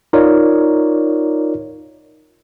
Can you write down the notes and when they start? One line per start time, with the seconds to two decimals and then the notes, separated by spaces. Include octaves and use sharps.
0.13 D#4 F4 A#4 C#5 D5